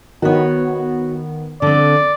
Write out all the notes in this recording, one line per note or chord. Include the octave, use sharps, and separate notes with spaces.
D#3 B3 F#4 C#5
D3 C4 D5